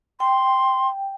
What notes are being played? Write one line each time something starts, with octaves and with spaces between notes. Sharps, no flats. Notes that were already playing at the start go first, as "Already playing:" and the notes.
G5 C6